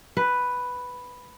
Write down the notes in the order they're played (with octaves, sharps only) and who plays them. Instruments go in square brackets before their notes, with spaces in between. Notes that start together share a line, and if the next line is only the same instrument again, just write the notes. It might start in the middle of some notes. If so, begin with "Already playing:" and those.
[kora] B4